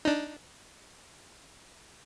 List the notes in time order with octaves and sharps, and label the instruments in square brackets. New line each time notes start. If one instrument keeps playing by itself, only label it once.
[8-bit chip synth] D4 D#4